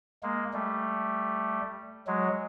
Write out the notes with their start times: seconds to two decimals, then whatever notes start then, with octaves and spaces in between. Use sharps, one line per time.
0.23 G#3 A#3
0.53 G3 A3
2.07 F#3 G#3